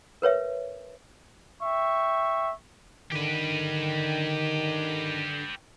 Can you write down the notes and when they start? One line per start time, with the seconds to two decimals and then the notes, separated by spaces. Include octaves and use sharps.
0.22 A#4 B4 C#5 E5
1.63 E5 G5 C#6
3.12 D3 D#3 G4 B4